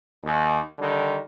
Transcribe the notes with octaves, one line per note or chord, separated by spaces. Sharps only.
D#2
D3 D#3 G3